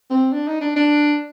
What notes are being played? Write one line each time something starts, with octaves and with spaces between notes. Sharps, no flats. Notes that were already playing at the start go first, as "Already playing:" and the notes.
C4
D4
D#4
D4
D4